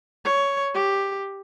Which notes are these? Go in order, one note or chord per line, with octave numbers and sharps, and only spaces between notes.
C#5
G4